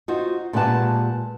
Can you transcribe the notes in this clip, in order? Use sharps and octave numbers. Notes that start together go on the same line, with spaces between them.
D#4 F4 F#4 C5
A#2 G#3 G4 B4 F#5 A5